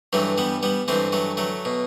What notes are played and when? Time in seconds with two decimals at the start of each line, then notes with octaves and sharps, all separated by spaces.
0.13 G2 E3 F#3 A3
0.38 G3 B3
0.63 G3 B3
0.88 G2 E3 A3 C4
1.12 F#3 A3
1.37 F#3 A3
1.65 B2